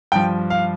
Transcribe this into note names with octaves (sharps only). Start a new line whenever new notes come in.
G2 F3 G5
F5